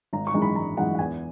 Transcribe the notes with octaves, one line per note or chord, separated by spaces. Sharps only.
G#1 A#5
C#6
F#2 E3 G#3 D#4
B5
G#1 A#5
F#2 E3 G#3 D#4 F#5
F#5
E2 G#5